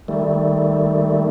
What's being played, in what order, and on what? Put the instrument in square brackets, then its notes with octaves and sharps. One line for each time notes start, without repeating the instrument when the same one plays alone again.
[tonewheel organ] D#3 G3 A3